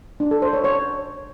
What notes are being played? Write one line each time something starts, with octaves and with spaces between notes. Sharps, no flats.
D4
A4
C5
C#5
C#5